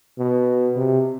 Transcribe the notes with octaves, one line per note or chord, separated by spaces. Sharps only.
B2
C3